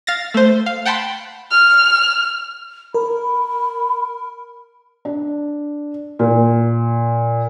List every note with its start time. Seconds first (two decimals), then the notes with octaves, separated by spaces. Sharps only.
0.07 F5 A6 A#6
0.34 A3 C5
0.66 F5
0.85 F#5 G5 A5 B5 C6
1.51 F6
2.94 A#4 B5
5.05 D4
6.19 A#2